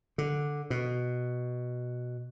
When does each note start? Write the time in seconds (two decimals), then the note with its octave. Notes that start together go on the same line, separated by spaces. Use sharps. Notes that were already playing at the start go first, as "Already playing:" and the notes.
0.18 D3
0.70 B2